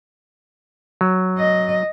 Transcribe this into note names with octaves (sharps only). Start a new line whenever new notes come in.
F#3
D#5